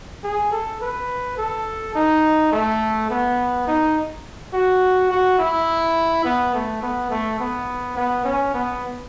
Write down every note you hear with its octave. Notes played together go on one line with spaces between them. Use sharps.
G#4
A4
B4
A4
D#4
A3
B3
D#4
F#4
F#4
E4
B3
A3
B3
A3
B3
B3
C#4
B3